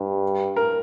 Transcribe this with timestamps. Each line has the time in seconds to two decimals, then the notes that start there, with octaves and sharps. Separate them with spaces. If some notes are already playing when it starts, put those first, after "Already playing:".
Already playing: G2
0.56 A#4